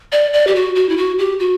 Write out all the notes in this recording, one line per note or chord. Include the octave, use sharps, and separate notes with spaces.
D5
D5
G4
F#4
F#4
E4
F#4
G4
F#4